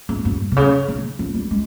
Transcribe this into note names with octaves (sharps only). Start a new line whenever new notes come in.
G#2
G2
C3
C#3
D#3
F3
G3
G#3